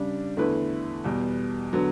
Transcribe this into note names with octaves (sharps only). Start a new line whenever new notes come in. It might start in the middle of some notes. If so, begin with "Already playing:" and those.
Already playing: C#3 G3 D4
E2 D3 A3 E4 B4
E2 B2 G3
D3 F#3 B3